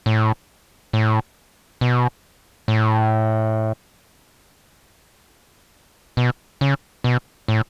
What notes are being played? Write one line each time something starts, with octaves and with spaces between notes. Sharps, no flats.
A2
A2
B2
A2
B2
C#3
B2
A2